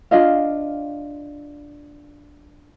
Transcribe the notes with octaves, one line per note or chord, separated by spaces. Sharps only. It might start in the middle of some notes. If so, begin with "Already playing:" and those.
D4 F4 D#5 F5